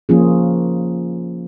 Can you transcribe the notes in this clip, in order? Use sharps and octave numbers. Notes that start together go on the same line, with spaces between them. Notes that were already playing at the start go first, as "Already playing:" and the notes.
F3 A#3 C#4 F4 G#4